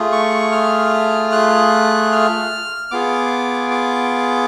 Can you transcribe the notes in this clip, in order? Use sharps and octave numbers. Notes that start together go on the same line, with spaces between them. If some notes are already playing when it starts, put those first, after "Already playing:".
Already playing: A3 F4 G#4
C#6
F6
F#6
F6
B3 F4 G#4 D6
D6